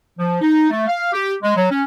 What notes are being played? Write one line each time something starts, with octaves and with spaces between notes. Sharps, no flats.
F3
D#4
A3
F5
G4
G#3
F#3
C#4